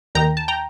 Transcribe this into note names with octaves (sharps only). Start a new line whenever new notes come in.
D#2 D#3 G5 A#5
A5
G5 A#5